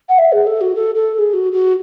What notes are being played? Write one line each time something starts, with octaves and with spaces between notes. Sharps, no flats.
F#5
E5
G#4
A4
F#4
A4
A4
A4
G#4
F#4
F#4